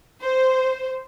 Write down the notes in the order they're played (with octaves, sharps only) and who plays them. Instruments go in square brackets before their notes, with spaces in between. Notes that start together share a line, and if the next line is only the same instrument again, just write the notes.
[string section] C5